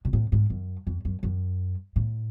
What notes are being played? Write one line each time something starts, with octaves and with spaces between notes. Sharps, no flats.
B2
A2
G#2
F#2
F2
F#2
F#2
A2